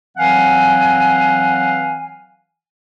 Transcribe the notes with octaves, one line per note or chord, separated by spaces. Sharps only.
E3 F#3 C4 F5 F#5 G#5